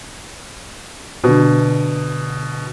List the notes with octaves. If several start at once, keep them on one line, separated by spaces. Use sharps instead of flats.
B2 D3